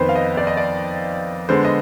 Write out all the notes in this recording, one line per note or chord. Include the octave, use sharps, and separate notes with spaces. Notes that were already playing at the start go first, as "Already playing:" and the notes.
Already playing: F2 D#3 B3 B4 C5
F5
D#5
D5
D#5
D5
D3 G#3 B3 C5
D#5